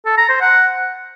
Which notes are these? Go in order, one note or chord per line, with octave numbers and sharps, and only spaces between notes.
A4
A#5
C5
F#5